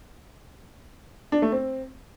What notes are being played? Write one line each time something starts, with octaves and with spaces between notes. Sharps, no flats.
D4
A3
C4